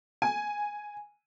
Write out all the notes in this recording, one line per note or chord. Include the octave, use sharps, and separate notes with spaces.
G#5